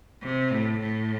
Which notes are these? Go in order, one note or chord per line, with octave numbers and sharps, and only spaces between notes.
C3
A2
A2